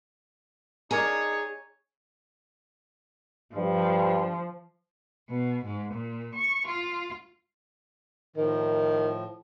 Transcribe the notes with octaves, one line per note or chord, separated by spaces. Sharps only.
D4 D#4 G#4 A#4 C#5
G2 F3
B2
G#2
A#2
C#6
F4
A2 D#3 F3